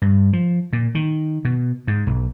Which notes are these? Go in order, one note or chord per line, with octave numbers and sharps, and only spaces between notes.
G2
F3
A#2
D#3
B2
G#2
B1